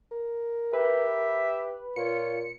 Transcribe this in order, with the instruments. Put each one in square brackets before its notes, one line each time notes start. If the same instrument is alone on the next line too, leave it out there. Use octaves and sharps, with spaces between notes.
[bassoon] A#4
[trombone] G4 [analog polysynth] B4 [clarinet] E5
[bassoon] A#2 [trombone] F4 [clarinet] C#5 [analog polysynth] C#7